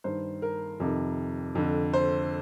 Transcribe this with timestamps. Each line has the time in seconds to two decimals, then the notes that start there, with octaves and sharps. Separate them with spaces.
0.04 G2 D#3 C5
0.42 A#4
0.80 F2 C3 D#3
1.55 F2 D3
1.94 C5